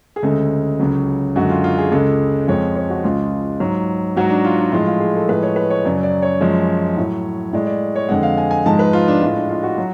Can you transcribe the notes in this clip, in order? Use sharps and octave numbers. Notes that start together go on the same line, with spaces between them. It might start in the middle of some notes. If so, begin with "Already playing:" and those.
G#4
D2 C#3 G#3 A4
C#2 C#3 F#3
F#2 D3 G#3 F#4
F4
F4
G#4
C#2 C#3 G#3 A4
F2 F3 G#3 C#5
C#5
F#4
C#2 C#3 G#3 F4
G#2 F#3
G#2 F#3 F#4
D4
F4
D4
A2 F3 G#3 F4
F4
G#4
A4
A2 F3 G#3 B4
C#5
B4
C#5
F#2 C#3 F#3 D5
D5
C#5
F#2 F3 G#3
A2 F#3
A2 G#3 D5
D5
C#5
F2 D3 G#3 F#5
F5
G#5
G#5
G#2 F3 G#3 A5
B4
F4
D4
A2 G#3 F4
D4
F4
F#4
F#3